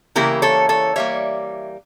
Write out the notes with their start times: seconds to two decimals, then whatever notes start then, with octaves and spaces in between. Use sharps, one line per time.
0.15 C#3 E3 A#3 E4 G4 A#4
0.42 A4 C#5
0.69 A4 C#5
0.96 E3 G3 A#3 C#5 E5